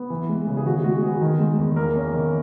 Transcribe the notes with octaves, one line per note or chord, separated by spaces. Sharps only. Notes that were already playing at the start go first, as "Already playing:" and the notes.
Already playing: B3
E3
G#3
C#3
G#4
D#3 F#4
G#3 F#4
B3 G#4
D#3
G#3
E2
A#3 A#4
C#4
D#3